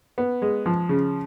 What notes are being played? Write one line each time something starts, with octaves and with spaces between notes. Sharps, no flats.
B3
G#3
F3
C#3